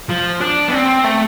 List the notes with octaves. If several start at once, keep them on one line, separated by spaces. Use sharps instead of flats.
F3
D4
B3
C4
A3